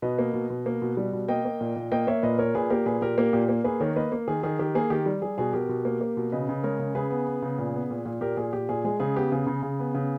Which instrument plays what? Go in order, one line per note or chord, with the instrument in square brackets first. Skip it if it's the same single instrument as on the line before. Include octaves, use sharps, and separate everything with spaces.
[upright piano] B2 B4 D#5
A#3
B2
B2
A#3
B2
G3
B2
A#3 D#5 G5
A#3
A#2
A#2
A#3 D#5 G5
A#3 C#5 E5
A#2 B4 D#5
A#3 A#4 C#5
A#2 G#4 B4
A#3 G4 A#4
A#2 G#4 B4
A#2 G4 A#4
A#3 G4 A#4
A#2 G4
A#3
A#3 G#4 B4
D#3 A#4 C#5
A#3 B4 D#5
A#3
D#3 G#4
D#3 G#4
D#3 G4
A#3 G#4
D#3 G4
G3
G3 G#4
B2 G#4
B2 G4 A#4
B2
A#3
A#3
B2
C#3 B4 D#5
C#3
G#3 A#4 C#5
C#3
C#3 G#4 B4
B3
B3
C#3
A#2
B3
A#2
A#2
A#2 G4 A#4
A#2 G#4
A#2 G4
A#2 G#4
G#3 G#4
C#3 G#4
B3 G4
C#3 G#4
C#3
C#3
B3
C#3